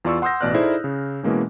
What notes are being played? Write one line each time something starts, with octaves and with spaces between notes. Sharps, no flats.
E2 F4 D5 C#6 E6
F#5 C6 D#6 E6 G6 A#6
A1 B2 D5 F6 F#6
D#4 E4 G#4 A4 C5 D5
C#3
B2 E3 G#3 A#3 C#4